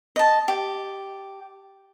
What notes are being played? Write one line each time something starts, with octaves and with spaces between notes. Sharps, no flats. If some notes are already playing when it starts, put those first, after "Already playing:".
D#5 A5
G4